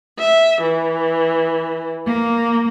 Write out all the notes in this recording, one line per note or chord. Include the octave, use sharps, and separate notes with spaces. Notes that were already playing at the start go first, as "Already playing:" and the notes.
E5
E3
A#3